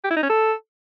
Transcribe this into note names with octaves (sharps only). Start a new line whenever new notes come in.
G4
E4
D#4
C#4
A4